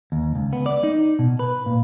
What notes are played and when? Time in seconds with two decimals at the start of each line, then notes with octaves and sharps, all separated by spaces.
0.12 D#2
0.36 C#2
0.53 B3
0.66 D5
0.83 D#4
1.19 B2
1.39 B4
1.66 A#2